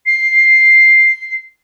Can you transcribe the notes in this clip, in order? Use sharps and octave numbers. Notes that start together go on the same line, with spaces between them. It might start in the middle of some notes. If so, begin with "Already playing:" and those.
C7